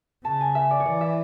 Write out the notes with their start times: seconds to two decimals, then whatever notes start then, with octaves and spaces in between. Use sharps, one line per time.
0.25 C#3 A5
0.41 G#5
0.55 E5
0.71 D5
0.80 C#5
0.85 E3 D5
1.01 E5